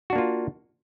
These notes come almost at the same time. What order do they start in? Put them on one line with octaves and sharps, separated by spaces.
F#4 D4 A#3 F4